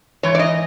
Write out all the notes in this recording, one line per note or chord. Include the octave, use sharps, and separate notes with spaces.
G#2 E3 C#5
D5
D#5